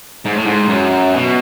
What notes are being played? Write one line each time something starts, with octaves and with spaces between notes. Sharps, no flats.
G#2
A2
G#2
F#2
B2